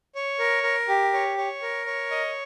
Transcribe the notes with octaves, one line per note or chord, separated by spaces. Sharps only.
C#5
A#4
A#4
G4
C#5
C#5
A#4
C#5
D#5